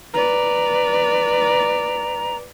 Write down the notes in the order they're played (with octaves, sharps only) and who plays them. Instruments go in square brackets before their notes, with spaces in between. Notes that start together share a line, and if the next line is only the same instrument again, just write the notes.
[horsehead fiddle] B4 D5 [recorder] A#5